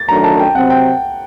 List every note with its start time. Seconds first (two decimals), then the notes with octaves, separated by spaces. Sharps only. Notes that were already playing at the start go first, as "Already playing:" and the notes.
Already playing: A6
0.08 F#2 D#3 F#3 A3 D4 A#5
0.24 A5
0.39 G5
0.55 C3 F#3 C4 F#5
0.70 G5